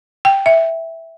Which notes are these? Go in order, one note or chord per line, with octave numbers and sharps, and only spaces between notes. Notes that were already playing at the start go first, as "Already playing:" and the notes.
G5
E5